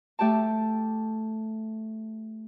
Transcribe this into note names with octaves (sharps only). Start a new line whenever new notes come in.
A3 G4 G5 A5